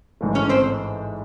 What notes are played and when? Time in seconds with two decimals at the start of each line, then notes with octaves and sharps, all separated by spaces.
0.21 A1 G#2 E3 A3
0.35 C#4 C#5
0.49 C4 C5